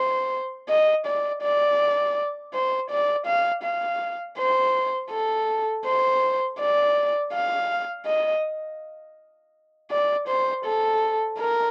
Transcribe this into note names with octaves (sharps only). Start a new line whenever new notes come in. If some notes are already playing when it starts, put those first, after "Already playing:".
Already playing: C5
D#5
D5
D5
C5
D5
F5
F5
C5
A4
C5
D5
F5
D#5
D5
C5
A4
A#4